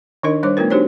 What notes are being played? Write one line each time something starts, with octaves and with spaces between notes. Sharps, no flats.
D#3 D4 D#4 A#4 D#5
G3 D4 C5 C#5 D6
A3 B3 D#4 F4 A#4 B4
D4 D#4 F#4 G4 C5 C#5